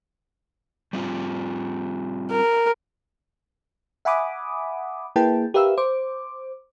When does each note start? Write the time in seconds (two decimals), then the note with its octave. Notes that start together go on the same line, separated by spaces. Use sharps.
0.93 G3 C4 F4
2.31 A#4
4.05 E5 F#5 G#5 B5 D6 D#6
5.16 A#3 E4 G#4 B4 G5 A5
5.54 G4 A#4 B4 E5 F5 E6
5.78 C5 D6